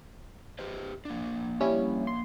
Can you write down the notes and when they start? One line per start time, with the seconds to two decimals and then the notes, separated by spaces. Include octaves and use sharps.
0.59 G4 B4 C5
1.05 A#3 D4
1.60 G3 C#4 E4
2.07 C6